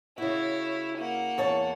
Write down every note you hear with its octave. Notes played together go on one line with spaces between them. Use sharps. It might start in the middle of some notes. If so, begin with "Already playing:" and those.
C#3 E4 F#4 C#5
A#3 F#5
E2 C#5 A5